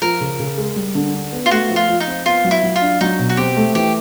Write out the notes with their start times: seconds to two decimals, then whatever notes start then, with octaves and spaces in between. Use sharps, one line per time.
0.02 F3 A#4
0.21 C#3
0.39 C#3
0.58 G#3
0.76 G3
0.95 D3
1.14 D4
1.33 B3
1.46 F4
1.51 A3 F#4
1.70 F3
1.76 F4
1.89 F3
2.00 D#4
2.07 C4
2.26 B3 F4
2.45 F#3
2.51 E4
2.63 F#3
2.76 F4
2.81 D4
3.01 F#3 D#4
3.19 B2
3.29 F#4
3.37 C4 G4
3.57 A3
3.75 E3 G4